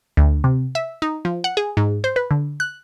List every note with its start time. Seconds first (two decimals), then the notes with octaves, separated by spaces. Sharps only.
0.17 D2
0.44 C3
0.75 E5
1.02 D#4
1.25 F3
1.44 F#5
1.57 G#4
1.77 G#2
2.04 C5
2.16 B4
2.31 D3
2.60 F#6